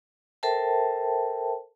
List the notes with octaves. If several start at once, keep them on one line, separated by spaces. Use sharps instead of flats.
A4 A#4 C5 E5 G5 A5